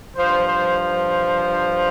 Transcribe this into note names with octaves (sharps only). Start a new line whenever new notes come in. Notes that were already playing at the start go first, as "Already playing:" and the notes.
G2 F3 C5
C5
C5